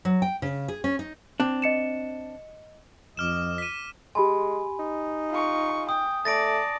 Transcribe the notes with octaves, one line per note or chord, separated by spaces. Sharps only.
F#3
G5
C#3
G#4
C#4
D#4
C4 D4
D#5 C#7 E7
F2 D#5 D6 F6 E7
B6 D#7
G#3 G4 G#5 B5 C6
D#4
F4 C#6
G5 D#6
A3 D5 A5 A6 A#6 D7